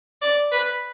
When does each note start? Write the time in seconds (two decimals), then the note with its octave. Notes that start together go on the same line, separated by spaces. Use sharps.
0.22 D5
0.52 B4